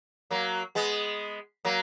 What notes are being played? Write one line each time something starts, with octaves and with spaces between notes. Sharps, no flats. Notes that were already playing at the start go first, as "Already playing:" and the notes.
F#3 A#3
G#3 B3
F#3 A#3